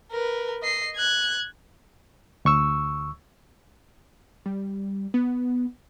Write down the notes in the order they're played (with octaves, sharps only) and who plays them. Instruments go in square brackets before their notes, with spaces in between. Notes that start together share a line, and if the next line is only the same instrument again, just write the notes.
[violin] A#4 B4
D#5 C7
F#6 G#6
[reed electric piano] D2 C#6 E6
[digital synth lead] G3
B3